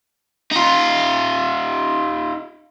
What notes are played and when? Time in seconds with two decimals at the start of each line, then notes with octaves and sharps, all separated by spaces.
0.51 D#4 F4